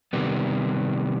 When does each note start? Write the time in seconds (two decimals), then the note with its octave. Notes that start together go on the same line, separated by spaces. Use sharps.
0.13 C3 D#3 G3 B3